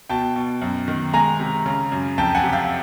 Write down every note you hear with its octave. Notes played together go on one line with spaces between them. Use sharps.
B2 G5 A5
B2
F#2
D#3
G#3 G#5 A#5
C3
C#3
F#2
F2 G5 A5
F#5 G#5
C3
F5 G5